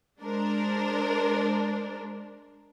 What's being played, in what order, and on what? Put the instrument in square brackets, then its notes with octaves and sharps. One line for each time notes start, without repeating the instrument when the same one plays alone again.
[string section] G#3 D4 A#4 C5